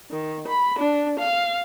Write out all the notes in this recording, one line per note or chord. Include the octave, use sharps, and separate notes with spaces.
D#3
B5
D4
F5